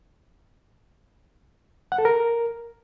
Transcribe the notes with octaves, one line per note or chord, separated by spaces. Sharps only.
F#5
A4
A#4